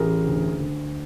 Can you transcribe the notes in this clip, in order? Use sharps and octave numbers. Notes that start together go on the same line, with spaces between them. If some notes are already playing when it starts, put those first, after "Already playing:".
Already playing: A1 G#4 A#4
D2
D2